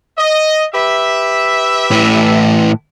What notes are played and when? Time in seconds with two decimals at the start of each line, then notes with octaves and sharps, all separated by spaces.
0.18 D#5
0.73 G4 B4 E5
1.92 A2 E3